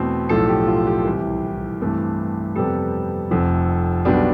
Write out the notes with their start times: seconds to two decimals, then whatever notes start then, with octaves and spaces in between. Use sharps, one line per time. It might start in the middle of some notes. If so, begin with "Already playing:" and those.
Already playing: E2 B2 A3 C4
0.29 B1 A2 F3 A4
0.48 G4
0.67 F4
0.87 G4
1.05 C2 C3 E3
1.80 G2 E3 A3 C4
2.56 F2 C3 G3 B3 A4
3.31 F1 F2 C3 F3
4.05 B1 B2 G3 B3 D4